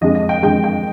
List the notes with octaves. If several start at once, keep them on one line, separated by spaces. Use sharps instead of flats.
F2 D3 G#3 D#5
D#5
G5
F2 D3 G#3 G5
G5